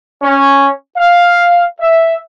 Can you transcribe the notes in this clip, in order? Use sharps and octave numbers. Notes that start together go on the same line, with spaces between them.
C#4
F5
E5